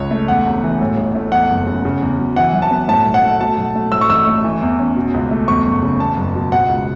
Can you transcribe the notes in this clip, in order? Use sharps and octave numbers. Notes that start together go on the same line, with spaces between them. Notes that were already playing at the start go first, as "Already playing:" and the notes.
Already playing: C#2 C#3 C#5
A3
E2 F#5
E1
E3
A2
A1
A3
E2 F#5
F#1
C#3
C#3
E2
F#3
E3 F#5
F#2
A5
B3
A2 A5
B1
F#5
A3
B2 A5
B1
A3
A2 E6
C#6
A1 E6
A3
E3
E2
C#4
B2
C#2
A3
E2 C#6
F#1
C#3
E2 A5
F#1
B2
B2 F#5
C#2